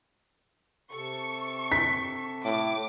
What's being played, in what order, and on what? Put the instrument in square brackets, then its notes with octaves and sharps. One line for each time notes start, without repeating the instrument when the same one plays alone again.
[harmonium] C3 A4 [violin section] C#6
[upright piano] B6
[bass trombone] A2 [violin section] D6